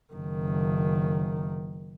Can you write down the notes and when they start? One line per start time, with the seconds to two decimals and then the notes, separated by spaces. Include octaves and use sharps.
0.13 F#1 D#3